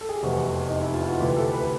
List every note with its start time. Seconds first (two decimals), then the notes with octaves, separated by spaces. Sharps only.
0.01 A4
0.09 G#4
0.16 G4
0.23 F1 E2 C3 F#4
0.68 D#4
0.81 E4
0.94 F4
1.07 F#4
1.20 D2 C3 E3 G4
1.36 A4
1.53 B4